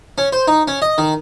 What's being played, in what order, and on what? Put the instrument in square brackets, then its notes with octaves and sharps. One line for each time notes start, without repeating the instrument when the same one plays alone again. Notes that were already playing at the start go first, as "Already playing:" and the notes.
[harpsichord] C#4
C5
D#4
C#4
D#5
D#3